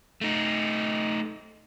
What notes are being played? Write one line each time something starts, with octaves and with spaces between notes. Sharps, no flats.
A3 D#4